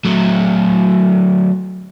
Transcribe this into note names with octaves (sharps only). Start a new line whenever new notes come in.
F#3 A3